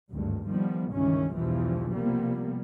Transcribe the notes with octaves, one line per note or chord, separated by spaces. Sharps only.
G#1 D2 G2
D#3 F3 G3 B3
C#2 G2 D#3 E3 C#4
B1 E2 G2 B2 E3 F3
C3 F3 G3 A#3 B3